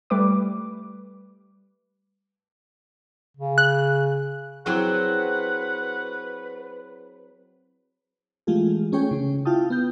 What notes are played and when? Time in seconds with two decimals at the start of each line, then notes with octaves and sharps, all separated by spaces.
0.10 G3 A3 B4 D6
3.37 C#3
3.58 F#6
4.66 F#3 C4 E4 F#4 G#4 B4 F#5
8.47 E3 G#3 A3 F4 G4 G#4
8.92 A3 C#4 G#4 C#5 G5
9.11 C#3 C#4
9.45 E4 F4 F5 G5 A5 D#6
9.70 B3 G6